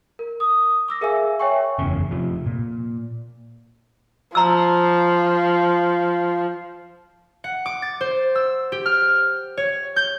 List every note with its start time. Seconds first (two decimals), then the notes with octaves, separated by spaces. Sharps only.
0.19 A#4
0.40 D#6
0.88 D6 E6 A#6
1.01 G#4 A#4 E5 F5 G#5 E6
1.40 C#5 E5 G5 G#5 C#6
1.79 F#1 E2 C#3
2.11 C3 F3
2.46 A#2
4.35 F3 A#5 E6
7.44 F#5
7.66 D6
7.82 A6
8.01 C5
8.36 E6
8.72 G4
8.86 F6
9.57 C#5
9.96 G6